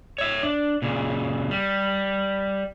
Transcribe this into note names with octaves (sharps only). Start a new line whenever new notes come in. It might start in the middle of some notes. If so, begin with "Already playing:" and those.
C#5 E5
D4
A#2 C#3
G3